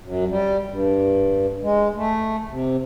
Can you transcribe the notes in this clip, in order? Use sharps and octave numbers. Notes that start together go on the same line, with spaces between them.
F#2
G3
G2
G#3
A3
C3